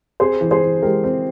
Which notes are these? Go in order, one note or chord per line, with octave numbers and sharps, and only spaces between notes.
C4 G#4 C5
E3
G#4 C5
E3
G#3 G4 A#4
C4